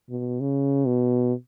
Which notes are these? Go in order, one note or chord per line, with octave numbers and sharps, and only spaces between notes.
B2
C#3
B2